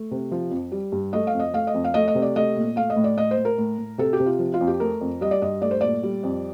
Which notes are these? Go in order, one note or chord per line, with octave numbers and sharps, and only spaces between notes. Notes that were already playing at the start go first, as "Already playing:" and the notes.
Already playing: A3
C3
F3
F2
G3
G2
A3 D#5
F5
F2
D#5
A3 F5
D#5
F2
F5
A3 D#5
D#5
C3
D5
A3 D#5
A#2
A3 F5
D#5
A2
D5
A2 D#5
C5
A2
A#4
A2
A2
C3 A4
G4
C3
F4
F3
F4
F2
G4
A3 A#4
F2
G3 D#5
D5
G2 D#5
A3 D5
C5
A#2 D5
G3
F2